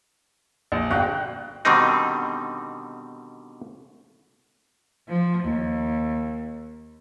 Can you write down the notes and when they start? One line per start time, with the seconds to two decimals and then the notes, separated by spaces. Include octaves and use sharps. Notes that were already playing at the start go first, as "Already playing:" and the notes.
0.72 A#1
0.90 G1 F#4 F5 G5 F#6
1.65 B2 D3 D#3 G3 C4 D#4
5.08 F3
5.44 D#2